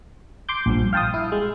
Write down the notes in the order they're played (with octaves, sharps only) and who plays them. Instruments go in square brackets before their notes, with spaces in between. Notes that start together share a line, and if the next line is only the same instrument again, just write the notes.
[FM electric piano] C6 D6 G6
A#1 G2 F3
F5 G5 A5 C6 D#6
E4
G#3